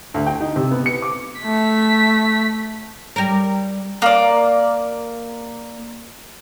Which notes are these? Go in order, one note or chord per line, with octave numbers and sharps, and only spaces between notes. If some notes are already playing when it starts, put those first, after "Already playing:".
D2
G5
D#4
C3
B3
C#7
D6
A3 B6
G3 A#4
A#3 D5